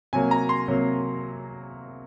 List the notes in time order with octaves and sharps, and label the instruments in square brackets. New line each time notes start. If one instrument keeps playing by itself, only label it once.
[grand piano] C3 F#3 A#3 G#5
A#5
C6
C3 F#3 A#3